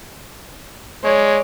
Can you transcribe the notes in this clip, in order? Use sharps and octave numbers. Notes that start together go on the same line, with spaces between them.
G#3 C#5 D5